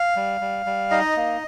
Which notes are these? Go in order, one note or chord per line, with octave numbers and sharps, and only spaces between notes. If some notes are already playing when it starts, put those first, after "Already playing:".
Already playing: F5
G3
G3
G3
D#4 D#5
A#3